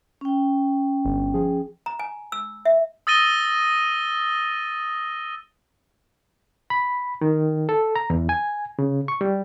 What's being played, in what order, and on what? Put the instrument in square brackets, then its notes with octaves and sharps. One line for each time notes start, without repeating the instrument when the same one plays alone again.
[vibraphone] C#4 G5
[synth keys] G1
F3 G#4
[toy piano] A#5
G#5
E6
E5
[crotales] D#6 E6 A6 A#6 D#7 G7
[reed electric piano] B5
D#3
A4
A#5
E2
G#5
C#3
C#6
G3